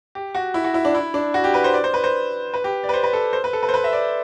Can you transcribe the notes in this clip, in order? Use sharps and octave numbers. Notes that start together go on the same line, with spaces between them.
G4
F#4
E4
F#4
E4
D4
E4
D4
F#4
G4
B4
C5
D5
C5
B4
C5
B4
G4
D5
B4
C5
B4
A4
C5
B4
A4
B4
C5
B4
E5
D5